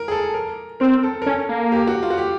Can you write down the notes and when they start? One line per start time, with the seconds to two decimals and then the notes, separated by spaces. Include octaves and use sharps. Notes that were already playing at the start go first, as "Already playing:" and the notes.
Already playing: A#4
0.08 G#4
0.12 A4
0.34 A#4
0.80 C4 A#4
1.03 A4
1.22 A#4
1.26 C#4 A4
1.49 A#3
1.72 G4
1.87 F#4
2.03 F4
2.10 F#4
2.18 G4